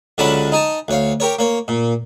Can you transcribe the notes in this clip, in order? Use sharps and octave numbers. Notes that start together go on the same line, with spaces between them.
C#2 D3 F#3 C#4 A5 B5
D#4 G#5 A5
D2 C#5 F5
G4 A#4 C#5
A#3 C#5
A#2